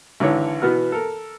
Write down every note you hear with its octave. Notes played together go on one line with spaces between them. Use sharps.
G#1 D3 E3 C#5
B2 E3 B3 F#4 F6
A4 A#4